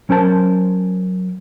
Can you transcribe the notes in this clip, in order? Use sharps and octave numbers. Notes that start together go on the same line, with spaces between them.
F#3 C#4 A#4 C5 A5